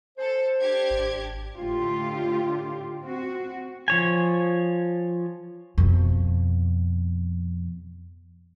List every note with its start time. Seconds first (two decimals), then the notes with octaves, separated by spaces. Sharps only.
0.18 A4 C5
0.61 D4 G4 G#6
0.90 G#1
1.59 A2 D3 A3 F4 G4
3.03 C4 F#4
3.88 F3 C#5 G#5
5.78 F2 B2